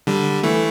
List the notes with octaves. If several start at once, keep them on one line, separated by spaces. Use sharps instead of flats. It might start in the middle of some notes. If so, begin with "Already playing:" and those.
D3 G3
E3 A3